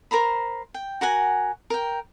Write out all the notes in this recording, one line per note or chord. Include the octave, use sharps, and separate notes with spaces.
A#4 C5 A#5 B5
G5
F#4 A#4 F#5 G#5
A#4 G5